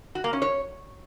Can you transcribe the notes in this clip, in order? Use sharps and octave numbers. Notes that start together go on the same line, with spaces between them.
F#4
A#3
C#4
C#5